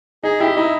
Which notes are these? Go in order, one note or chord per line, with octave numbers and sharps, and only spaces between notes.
D#4 G#4
E4 G4
D#4 E4